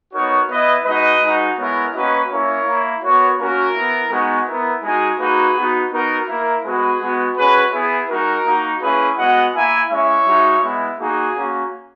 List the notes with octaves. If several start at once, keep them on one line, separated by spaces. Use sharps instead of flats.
B3 D#4 F#4 A#4 C#5
B3 E4 B4 D#5
G#3 D#4 F#4 B4 D#5
G#3 D#4 F#4
G#3 B3 E4 A#4 C#5
A#3 C#4 F#4 B4 D#5
A#3 C#4 E4 A#4 C#5
A#3 E4
B3 F#4 A#4 C#5
A#3 C#4 F#4 A#4
B3 E4
G#3 B3 D#4 F#4
B3 E4 A#4
G#3 D#4 F#4 G#4
A#3 D#4 F#4 G#4 B4
B3 D#4 F#4
B3 D#4 F#4 A#4
A#3 E4 A#4
G#3 B3 F#4 G#4 B4
G#3 B3 F#4
G#3 C#4 F#4 G#4 B4
B3 E4 G#4
G#3 D#4 F#4 A#4
A#3 D#4 F#4
A#3 C#4 E4 G#4 B4
G#3 B3 F#4 D#5 F#5
A#3 E4 E5 G#5
G#3 C#4 E4 C#5 E5
G#3 D#4 F#4
G#3 B3 E4
A#3 D#4 F#4 G#4
A#3 C#4 F#4